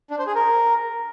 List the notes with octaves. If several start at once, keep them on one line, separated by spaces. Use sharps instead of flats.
D4
C5
G#4
A#4